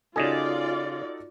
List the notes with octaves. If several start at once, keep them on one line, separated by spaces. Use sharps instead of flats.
C#3 D#4 F4 F#4 A4 D5 D#5 G#5